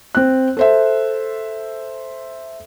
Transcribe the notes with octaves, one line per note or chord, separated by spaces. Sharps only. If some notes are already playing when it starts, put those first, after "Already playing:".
C4 F#6
A4 C5 E5